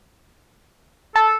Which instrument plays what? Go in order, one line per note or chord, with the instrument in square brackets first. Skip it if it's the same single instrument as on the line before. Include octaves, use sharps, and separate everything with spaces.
[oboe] A4 [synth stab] A5